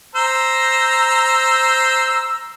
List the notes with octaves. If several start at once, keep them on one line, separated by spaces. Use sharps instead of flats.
C5 A#5 E6